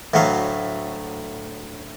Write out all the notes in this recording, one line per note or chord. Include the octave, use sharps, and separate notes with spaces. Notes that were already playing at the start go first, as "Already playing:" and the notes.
D2 A2 F#3 A3 F5